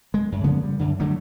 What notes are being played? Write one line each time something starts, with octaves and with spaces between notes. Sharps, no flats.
G#3
F#2
C#3 F3 A#3 B3
G3
F#2 D3
D3 F#3 G3 A3